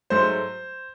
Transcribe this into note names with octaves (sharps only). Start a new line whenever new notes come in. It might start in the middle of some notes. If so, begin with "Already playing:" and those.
G#2 F#3 A3 C5